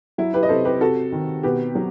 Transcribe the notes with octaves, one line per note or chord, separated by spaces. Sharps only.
F#3 E4
G4 B4
D#5
C3 A4 C5
G4 B4
C3 F#4 A4
D#3
B2 G4 B4
F#3